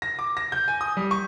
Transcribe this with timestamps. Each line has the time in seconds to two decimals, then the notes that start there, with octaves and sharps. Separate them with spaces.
0.02 A#6
0.19 D6
0.37 A#6
0.52 G6
0.68 G#5
0.81 D#6
0.97 G3
1.11 C#6